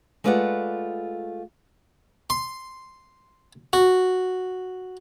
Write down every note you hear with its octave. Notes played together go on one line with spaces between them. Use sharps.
G#3 A3 F4 B4 D5 F#5
C6
F#4